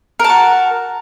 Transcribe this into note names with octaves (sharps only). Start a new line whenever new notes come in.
F#4 A#4 A5